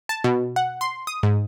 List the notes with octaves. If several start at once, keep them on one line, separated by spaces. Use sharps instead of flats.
A5
B2
F#5
C6
D#6
G#2